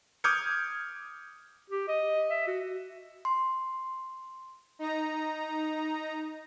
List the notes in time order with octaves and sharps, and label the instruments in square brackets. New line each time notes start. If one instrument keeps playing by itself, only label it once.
[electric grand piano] D6 D#6 F6 G6 G#6 C#7
[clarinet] G4
D#5
E5
F#4
[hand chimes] C6
[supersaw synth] D#4 A#5